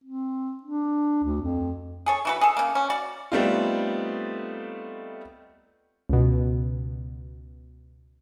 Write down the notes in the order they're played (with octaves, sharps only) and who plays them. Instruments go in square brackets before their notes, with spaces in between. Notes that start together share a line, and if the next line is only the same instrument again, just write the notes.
[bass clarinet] C4
D4
D2
F2
[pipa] G#4 A4 C#5
E3 F#4 B4
G#4 A4
C#3 A#3
C#4
F#4 D5
[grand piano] G3 A3 B3 C4 D#4 F4
[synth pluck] C#2 B2